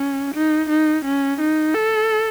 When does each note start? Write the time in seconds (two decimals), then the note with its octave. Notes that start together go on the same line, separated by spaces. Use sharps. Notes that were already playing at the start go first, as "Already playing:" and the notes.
Already playing: C#4
0.35 D#4
0.70 D#4
1.05 C#4
1.40 D#4
1.75 A4